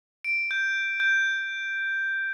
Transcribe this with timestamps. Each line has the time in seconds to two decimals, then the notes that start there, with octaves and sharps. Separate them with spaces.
0.24 D7
0.51 G6
1.00 G6